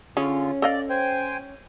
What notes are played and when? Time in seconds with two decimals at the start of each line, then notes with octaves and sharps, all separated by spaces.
0.17 D3 C#4 F4 G#4
0.62 A4 D5 D#5 F5
0.90 C5 G5 G#5